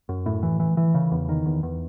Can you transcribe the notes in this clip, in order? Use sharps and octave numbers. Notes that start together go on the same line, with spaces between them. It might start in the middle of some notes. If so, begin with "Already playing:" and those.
F#2
A2
E3
E3
E3
C#3
E2
D#3
E2
E2